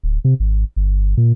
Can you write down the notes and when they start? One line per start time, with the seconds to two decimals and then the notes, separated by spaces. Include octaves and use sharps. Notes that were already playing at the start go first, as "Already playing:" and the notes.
0.03 D1
0.25 C3
0.40 G#1
0.76 G1
1.17 A#2